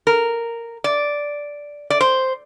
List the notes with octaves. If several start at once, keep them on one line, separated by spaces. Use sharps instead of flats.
A#4
D5
D5
C5